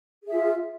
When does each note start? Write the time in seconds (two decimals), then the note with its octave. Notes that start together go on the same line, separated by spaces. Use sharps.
0.23 G#4
0.28 E5
0.32 F4